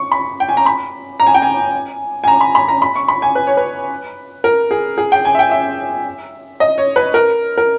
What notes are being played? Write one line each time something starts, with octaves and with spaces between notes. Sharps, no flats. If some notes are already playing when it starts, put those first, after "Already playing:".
Already playing: C#6
B5
G5
G#5
A#5
B5
A#5
G#5
G5
G#5
G#5
A#5
B5
B5
A#5
B5
C#6
B5
G#5
B4
C#5
B4
A#4
G#4
G#4
G5
G#5
E5
G5
E5
D#5
C#5
B4
A#4
A#4